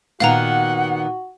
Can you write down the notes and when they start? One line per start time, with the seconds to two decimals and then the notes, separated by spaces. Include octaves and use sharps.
0.20 A#2 D#3 B3 F#4 F5 F#5 A#5